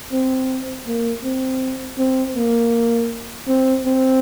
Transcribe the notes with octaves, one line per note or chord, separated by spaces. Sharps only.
C4
A#3
C4
C4
A#3
C4
C4